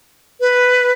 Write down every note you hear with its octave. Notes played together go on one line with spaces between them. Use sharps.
B4